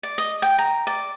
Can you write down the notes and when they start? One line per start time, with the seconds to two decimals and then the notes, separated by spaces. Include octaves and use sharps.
0.03 D5
0.18 D#5
0.42 G5
0.58 A#5
0.87 D5